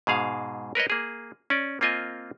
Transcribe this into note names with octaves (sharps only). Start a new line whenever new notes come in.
G#2 B2 G#4 F5
A#4 B4 C#5 D#5
A#3 G#4
C#4 D5
A#3 C4 F4 D#5 G#5